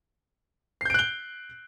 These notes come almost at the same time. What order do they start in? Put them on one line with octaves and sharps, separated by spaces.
C7 G6 D7 F#6 G7